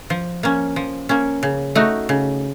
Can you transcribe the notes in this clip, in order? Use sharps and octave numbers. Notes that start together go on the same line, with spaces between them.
F3
A#3 C#4
F3
A#3 C#4
C#3
A3 D#4 F#4
C#3